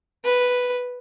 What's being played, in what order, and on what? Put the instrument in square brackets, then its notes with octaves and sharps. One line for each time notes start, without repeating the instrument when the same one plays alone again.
[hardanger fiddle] B4